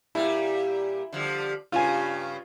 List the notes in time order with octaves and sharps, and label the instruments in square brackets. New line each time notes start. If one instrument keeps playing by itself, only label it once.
[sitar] A#2 G3 [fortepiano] E4
[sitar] D3 F3 G3
[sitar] G2 C#3 [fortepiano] F4 G#5